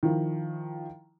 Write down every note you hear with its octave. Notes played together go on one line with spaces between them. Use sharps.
D#3 F3 E4